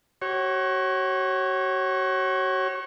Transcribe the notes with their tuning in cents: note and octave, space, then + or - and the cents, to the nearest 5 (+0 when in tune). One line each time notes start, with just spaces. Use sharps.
F#4 +35 C#5 -25